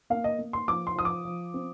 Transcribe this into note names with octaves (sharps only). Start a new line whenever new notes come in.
A#3 F5
D#5
A#3
C6
F3 D6
C6
F3 D#6
D6
F3
C4